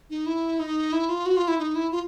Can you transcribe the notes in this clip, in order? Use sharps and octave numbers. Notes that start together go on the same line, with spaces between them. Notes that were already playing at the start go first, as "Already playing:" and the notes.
D#4
E4
D#4
E4
F4
F#4
F4
E4
D#4
E4
F4